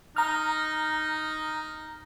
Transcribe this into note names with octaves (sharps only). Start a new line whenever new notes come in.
D#4 A#5 F6